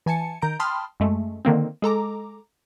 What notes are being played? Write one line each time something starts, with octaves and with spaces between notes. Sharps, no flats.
E3 G#5 A5 C#7
D#3 A#5 G6 D7
G5 A5 B5 C6 D#6 F6
F#2 G#3 A3
D3 D#3 A#3 C4
G#3 A4 A#5 D6